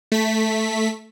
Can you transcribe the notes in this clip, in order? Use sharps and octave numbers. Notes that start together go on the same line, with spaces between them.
A3 B6